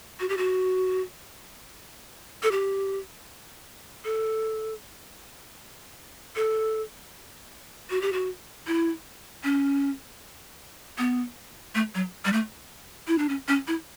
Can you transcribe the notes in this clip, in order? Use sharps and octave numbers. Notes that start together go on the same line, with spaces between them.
F#4
G4
F#4
A4
G4
A4
A4
F#4
G4
F#4
E4
C#4
B3
A3
F#3
G3
A3
E4
D4
C#4
C#4
E4